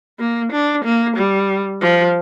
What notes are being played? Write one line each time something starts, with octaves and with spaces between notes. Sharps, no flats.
A#3
D4
A#3
G3
F3